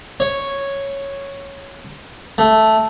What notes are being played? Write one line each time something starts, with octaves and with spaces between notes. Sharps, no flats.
C#5
A3